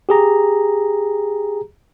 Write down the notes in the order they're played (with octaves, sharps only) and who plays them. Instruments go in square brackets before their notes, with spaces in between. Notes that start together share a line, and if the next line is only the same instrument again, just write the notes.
[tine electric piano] G4 G#4 A#5